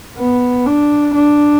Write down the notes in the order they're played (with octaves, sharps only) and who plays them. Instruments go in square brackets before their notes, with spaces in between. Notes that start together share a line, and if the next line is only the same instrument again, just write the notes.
[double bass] B3
D4
D4